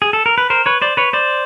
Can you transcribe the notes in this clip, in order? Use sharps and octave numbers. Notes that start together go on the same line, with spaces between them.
G#4
A4
A#4
B4
A#4 C5
B4 C#5
C5 D5
B4 C#5
C5 D5